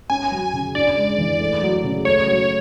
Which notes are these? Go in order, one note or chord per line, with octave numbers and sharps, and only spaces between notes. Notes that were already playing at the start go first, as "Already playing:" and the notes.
C#4 G#5
F#3
C#3
D4 D5
G#3
E3
A3
F#3
C#3
A3 C#5
F#3